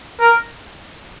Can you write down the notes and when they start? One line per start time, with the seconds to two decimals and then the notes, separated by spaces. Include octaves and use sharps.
0.20 A#4